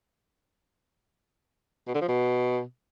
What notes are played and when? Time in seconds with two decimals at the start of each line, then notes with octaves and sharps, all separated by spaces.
1.87 B2
1.94 D3
2.01 F3
2.08 B2